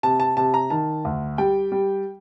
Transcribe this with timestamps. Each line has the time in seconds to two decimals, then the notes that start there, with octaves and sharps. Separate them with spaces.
0.03 C3 A5
0.20 A5
0.37 C3 A5
0.54 A#5
0.70 D#3 A5
1.05 D2
1.38 G3 G5
1.72 G3